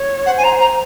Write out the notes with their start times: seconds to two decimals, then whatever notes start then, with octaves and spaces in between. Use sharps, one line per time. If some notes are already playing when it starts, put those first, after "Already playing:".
Already playing: C#5
0.26 C5 F#5
0.37 G#5
0.44 A#5
0.60 A#5